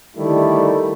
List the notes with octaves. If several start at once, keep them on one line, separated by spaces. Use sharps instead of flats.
D3 D#3 G3 A3 E4